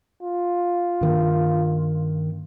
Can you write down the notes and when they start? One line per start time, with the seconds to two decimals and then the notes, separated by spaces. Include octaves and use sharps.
0.23 F4
1.01 G2 D#3 A#3